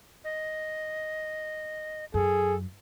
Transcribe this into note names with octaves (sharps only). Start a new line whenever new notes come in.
D#5
F#2 G#4 A4